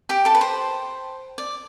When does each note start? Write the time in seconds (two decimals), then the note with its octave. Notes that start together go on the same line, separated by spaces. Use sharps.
0.09 G4 G5
0.25 A4 A5
0.35 B4
0.41 C5
1.38 D5